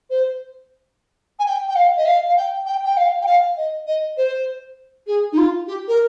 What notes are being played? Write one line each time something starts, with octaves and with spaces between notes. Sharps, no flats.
C5
G#5
G5
G5
F5
D#5
F5
F5
G5
G5
G5
F5
G5
F5
D#5
D#5
C5
G#4
D#4
F4
G4
A#4